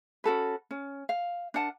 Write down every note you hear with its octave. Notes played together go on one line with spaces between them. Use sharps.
C#4 F#4 A4 B4
C#4
F5
D4 A#4 F#5 A5